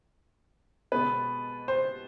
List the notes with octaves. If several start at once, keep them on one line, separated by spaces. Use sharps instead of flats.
B2 G#3 B3 B4
C5